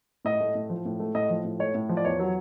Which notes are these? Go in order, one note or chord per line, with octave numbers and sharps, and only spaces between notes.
A2 D#5
A3
A2
F3
A2
A3
A2 D#5
F3
A2
A3 C#5
A2
F3
D5
E2 C#5
F#3